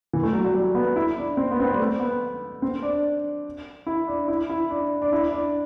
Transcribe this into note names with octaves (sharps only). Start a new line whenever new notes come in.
E3
A3
F#3
F#3
G3
B3
E4
D4
C4
B3
C4
B3
G3
A3
B3
C4
D4
E4
D4
E4
E4
D4
D4
E4
D4